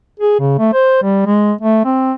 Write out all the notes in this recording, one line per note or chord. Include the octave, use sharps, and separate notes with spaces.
G#4
C#3
A3
C5
G3
G#3
A3
C4